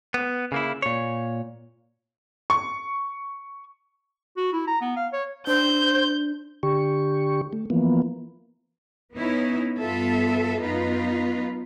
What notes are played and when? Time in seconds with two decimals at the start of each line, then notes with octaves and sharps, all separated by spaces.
0.14 B3
0.52 C#3 A#3 E4
0.82 A#2 C#5
2.50 C#6
4.37 F#4
4.53 E4
4.67 A#5
4.81 B3
4.97 F5
5.13 C#5
5.47 D4 C5 G6
6.63 D3 G4 C#6
7.53 A3
7.70 E3 F3 A#3 B3
9.14 B3 C#4 D#4 E4
9.78 G2 B3 F4 A4 E5
10.62 F#2 B3 D#4 F4 B4